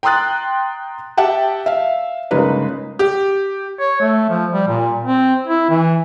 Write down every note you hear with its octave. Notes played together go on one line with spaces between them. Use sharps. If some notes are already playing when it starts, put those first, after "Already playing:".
G5 A#5 C6 D#6 F#6 A6
G4 E5 F#5 G5 A5
E5 F5
G1 C#3 G#3 A#3 D#4 B4
G4
C#5
A3
F3
G3
A#2
C4
E4
E3